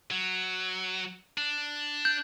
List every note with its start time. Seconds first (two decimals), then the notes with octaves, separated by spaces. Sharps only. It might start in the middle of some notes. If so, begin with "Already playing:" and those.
0.11 F#3
1.38 D4
2.05 G6